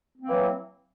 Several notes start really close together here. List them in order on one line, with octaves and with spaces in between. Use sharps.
C4 A#3 F#3 E3